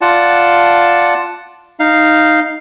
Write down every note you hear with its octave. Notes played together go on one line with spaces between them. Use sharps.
F4 D5 F#5 A5
D#4 F5